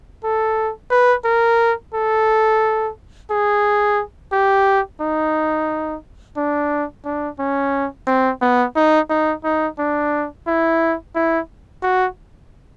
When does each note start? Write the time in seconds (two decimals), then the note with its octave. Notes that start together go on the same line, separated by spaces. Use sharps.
0.24 A4
0.91 B4
1.25 A#4
1.94 A4
3.31 G#4
4.33 G4
5.01 D#4
6.37 D4
7.05 D4
7.39 C#4
8.07 C4
8.42 B3
8.76 D#4
9.10 D#4
9.44 D#4
9.79 D4
10.47 E4
11.15 E4
11.83 F#4